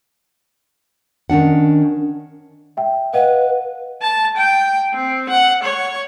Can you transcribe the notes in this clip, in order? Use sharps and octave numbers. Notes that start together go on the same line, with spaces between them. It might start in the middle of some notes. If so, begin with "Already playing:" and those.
D#3 C#4 D4 F#5
E5 G5
B4 D#5 F5 F#5
A5
G5
C4
F#5
C#5